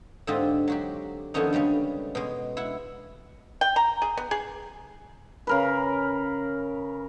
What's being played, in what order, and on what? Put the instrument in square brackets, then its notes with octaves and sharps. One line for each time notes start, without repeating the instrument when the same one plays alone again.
[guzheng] G#2 D3 C4 F4 G4 D#5
F#3 F#4 G4
F2 D3 D#3 B3 C#4 D#4
C#3 G3 G#3 C#4
B2 G#3
E4 F#5
[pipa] G5
A#5
G#4
B3
G#4
[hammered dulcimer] C#3 A#4 B4